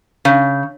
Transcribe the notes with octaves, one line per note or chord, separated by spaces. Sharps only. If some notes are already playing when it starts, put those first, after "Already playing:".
C#3